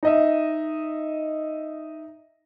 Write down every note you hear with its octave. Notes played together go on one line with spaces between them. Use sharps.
D#4 D#5 E5